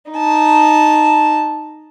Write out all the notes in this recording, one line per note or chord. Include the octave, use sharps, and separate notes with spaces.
D#4 A5